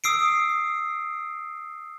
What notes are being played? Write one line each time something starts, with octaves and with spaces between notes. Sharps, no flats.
D#6 E6 C7 D7